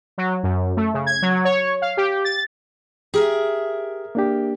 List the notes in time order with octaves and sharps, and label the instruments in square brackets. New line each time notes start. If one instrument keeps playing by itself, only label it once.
[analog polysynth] F#3
F#2
A3
C#3
G#6
F#3
C#5
F5
G4
A6
[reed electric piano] G4 [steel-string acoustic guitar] G#4 A#4 E5
[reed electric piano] A#3 D4 G4